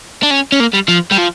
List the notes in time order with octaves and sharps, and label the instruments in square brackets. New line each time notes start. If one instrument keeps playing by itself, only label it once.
[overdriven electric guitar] D4
C#4
C#4
A#3
G3
F3
G3
F3